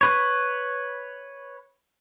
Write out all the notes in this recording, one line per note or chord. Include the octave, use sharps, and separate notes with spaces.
B4 C#5